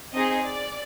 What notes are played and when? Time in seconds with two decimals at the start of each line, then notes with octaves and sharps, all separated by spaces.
0.13 C4 D#4 G#4 D#5
0.43 D5